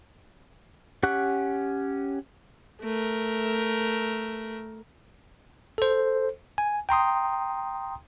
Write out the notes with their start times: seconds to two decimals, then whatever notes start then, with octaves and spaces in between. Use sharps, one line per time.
1.03 C#4 G4 F#5 C#6 F#6
2.81 A3 A#4
5.78 A4 C5
6.58 G#5
6.89 G5 A#5 C6 D#6